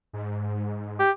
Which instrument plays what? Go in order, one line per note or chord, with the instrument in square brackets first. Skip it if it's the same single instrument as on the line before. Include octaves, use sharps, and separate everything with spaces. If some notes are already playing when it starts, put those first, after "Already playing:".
[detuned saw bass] G#2
[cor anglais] G4